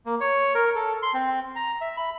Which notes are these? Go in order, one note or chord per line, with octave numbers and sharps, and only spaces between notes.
A#3
C#5
A#4
A4
C6
C4
A#5
E5
B5